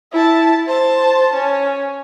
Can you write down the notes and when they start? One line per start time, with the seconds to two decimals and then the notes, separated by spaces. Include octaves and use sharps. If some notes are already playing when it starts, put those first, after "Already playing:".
0.12 E4 A5
0.67 C5 A5
1.34 C#4